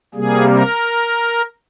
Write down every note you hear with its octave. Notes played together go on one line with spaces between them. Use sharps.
C3 G3 A#3 G#4
A#4